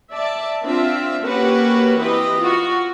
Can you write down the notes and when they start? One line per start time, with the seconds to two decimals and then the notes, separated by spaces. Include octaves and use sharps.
0.13 D5 E5 A5
0.64 C4 D4 F4 E5
1.26 A#3 C#4 F#4 G4 B4 F#5
1.99 E3 C4 G4 B4 D#5
2.42 F4 F#4